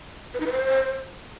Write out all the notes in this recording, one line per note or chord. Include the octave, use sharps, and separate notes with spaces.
B4
D#4
B4
C5